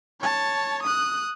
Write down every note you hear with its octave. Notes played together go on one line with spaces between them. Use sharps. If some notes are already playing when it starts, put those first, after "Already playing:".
C#5 A5
D#6 F#6